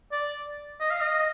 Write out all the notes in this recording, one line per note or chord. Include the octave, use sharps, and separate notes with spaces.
D5
D#5
F5
D#5